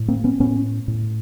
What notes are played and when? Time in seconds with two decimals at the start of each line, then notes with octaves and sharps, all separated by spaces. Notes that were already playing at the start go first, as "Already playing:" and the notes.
Already playing: A2
0.08 A#3 C4
0.24 B3 C#4
0.40 A2 B3 C#4
0.88 A2